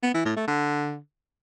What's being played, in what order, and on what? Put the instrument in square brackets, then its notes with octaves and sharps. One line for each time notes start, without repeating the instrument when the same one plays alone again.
[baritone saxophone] B3
E3
A2
A3
D3